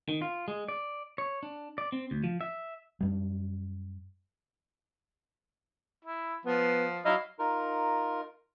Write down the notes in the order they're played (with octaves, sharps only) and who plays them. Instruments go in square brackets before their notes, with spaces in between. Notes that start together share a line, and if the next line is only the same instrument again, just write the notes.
[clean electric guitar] D#3
F4
G#3
D5
C#5
D4
D5
C4
D2
F3
E5
[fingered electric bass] F#2 G3
[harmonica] E4
[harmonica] F3 [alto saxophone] B3
[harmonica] F#3 E4 F5 [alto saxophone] D#5
[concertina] D#4 F4 A#4